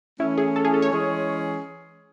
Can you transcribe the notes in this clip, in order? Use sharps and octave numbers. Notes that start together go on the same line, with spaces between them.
E3 A3 C#4 E4
G#4
A4
G#4
A4
C#5
E3 G#3 C#4 G#4